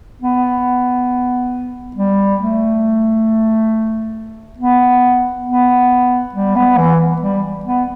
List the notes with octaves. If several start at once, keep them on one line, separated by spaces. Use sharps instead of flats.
B3
G3
A3
B3
B3
G3
B3
E3
G3
B3